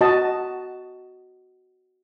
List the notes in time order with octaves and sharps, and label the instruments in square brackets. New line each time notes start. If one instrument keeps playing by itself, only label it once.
[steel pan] F#4 D#5 A5